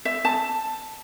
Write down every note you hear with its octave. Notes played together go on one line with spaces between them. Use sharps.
E5
A5